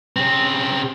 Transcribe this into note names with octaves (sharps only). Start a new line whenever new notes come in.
C#3 C4